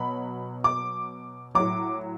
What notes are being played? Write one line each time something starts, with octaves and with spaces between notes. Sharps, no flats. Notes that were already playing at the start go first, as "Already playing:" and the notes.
Already playing: B2 F#3 B5
D6
A2 F#3 D6